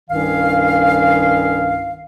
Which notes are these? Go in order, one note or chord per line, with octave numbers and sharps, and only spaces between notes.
C2 G2 D#3 C#4 F5